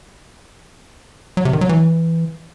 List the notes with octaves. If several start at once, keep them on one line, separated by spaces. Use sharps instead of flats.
F#3
C3
D#3
F#3
E3